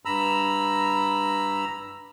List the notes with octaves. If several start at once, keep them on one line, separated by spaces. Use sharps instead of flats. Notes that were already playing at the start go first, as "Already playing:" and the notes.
G2 A#5 B5 E6